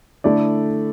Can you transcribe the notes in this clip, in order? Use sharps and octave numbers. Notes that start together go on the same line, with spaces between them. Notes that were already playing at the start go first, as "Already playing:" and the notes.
D3 A3 E4 A4 D5